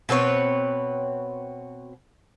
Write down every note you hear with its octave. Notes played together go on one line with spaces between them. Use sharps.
B2 C4 B4 C#5